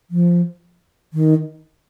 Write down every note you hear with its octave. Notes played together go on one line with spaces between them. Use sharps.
F3
D#3